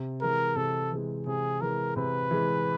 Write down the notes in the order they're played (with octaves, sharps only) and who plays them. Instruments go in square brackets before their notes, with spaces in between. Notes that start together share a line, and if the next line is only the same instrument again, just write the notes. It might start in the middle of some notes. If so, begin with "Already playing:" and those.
Already playing: [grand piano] C3
[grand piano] E3 G#3 [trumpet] A#4
[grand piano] C3 [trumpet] A4
[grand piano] E3 G#3
[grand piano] C3 [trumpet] G#4
[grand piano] E3 G#3 [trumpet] A#4
[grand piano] C3 [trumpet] B4
[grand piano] E3 G#3